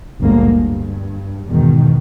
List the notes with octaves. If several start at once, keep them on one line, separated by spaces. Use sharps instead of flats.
G1 D2 A#2 G#3 A#3
G2
E2 G#2 B2 D#3